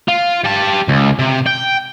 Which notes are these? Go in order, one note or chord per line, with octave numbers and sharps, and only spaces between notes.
F4
G3 A5
C#2
C3
G5